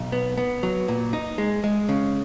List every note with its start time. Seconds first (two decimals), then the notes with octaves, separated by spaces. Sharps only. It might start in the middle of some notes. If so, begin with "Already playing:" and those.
Already playing: B1
0.12 B3
0.38 B3
0.63 F#3
0.88 A#2
1.13 D#4
1.38 G#3
1.64 G#3
1.89 C#3